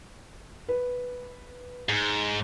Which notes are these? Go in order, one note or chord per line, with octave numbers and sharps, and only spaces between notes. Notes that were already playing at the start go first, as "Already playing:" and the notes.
B4
G#2